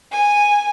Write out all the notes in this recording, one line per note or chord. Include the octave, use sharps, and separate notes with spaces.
G#5